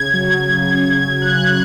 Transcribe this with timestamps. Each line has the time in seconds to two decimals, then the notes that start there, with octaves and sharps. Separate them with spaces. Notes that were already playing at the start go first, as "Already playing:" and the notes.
Already playing: C#3 G#6
0.13 F#3
0.50 C#3
0.86 F#3
1.13 G#6
1.22 C#3 F#6
1.40 F#6
1.48 G#6